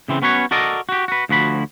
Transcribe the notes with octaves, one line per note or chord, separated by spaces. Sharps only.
C#3 E3 C4
B3 C#4 F#4 B4 C#5
F#4 A4 A#4 D5 D#5
F#4 G4
F#4 B4
D2 F3 F#4 B5